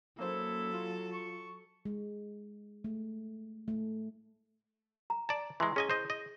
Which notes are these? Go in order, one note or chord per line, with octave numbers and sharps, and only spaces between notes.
F#3 A#3 C#4 E4 A4 C5
F4
C#6
G#3
A3
A3
A#5
D5 A5 A#5
E3 G#3 E4 C6 C#6
C#4 G#4 D#5 G#5
C5 D#5
D#5